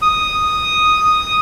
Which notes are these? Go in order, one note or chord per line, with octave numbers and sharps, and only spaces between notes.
D#6